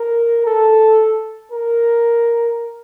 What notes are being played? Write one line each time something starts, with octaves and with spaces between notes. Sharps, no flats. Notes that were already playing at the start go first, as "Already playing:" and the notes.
Already playing: A#4
A4
A#4